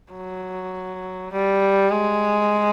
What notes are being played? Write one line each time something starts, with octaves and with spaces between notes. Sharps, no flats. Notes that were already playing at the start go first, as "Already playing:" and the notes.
F#3
G3
G#3